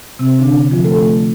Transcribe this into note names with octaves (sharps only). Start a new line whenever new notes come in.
C3 C4
D3 D4
F3 F4
A3 A4